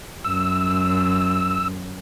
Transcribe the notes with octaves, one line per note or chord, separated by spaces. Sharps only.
F#2 E6